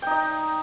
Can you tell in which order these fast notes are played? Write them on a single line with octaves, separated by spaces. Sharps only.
G5 D#4 D#5